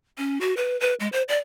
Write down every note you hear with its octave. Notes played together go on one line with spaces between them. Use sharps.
C#4
F#4
B4
B4
G#3
C5
D5